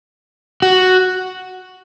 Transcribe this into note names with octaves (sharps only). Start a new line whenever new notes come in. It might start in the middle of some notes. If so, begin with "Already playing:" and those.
F#4